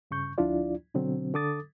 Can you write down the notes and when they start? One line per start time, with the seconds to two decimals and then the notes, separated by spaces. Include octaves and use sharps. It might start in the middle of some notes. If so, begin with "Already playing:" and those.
0.11 G2 C#3 C#6 G6
0.38 D2 F3 D4 E4 F4 D5
0.94 B2 D3 F#3 C4
1.34 D3 A4 D6 D#6 A6